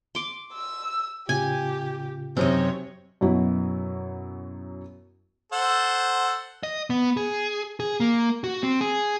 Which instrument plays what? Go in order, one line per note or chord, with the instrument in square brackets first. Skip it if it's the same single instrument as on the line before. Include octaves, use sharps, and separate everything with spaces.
[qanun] C6 D6
[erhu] E6
[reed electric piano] A2 C#3 F4 [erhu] G4 [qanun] G#5
[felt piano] F#2 C3 [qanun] C4 D#4 D#5 [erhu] C#5
[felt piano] F#2 B2 F#3 E4
[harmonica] A4 C5 F#5
[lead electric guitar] D#5
B3
G#4
G#4
A#3
F#4
C4
G#4